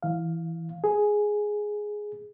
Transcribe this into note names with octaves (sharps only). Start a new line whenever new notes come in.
E3 F5
G#4